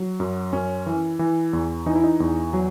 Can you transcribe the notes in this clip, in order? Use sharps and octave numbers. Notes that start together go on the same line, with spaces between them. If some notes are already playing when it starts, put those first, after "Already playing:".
Already playing: F#3
F#2
F#2 C#4
E3
E3
E2
E3 D#4
E4
D#4
E2
F#3